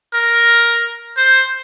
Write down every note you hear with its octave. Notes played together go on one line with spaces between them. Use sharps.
A#4
C5